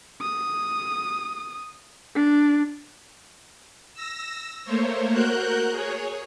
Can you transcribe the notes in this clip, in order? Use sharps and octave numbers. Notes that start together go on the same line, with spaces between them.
D#6
D4
E6 A#6
A3 A#3 C5 C#5
F#4 A#4 F#6 G6
G#4 C#5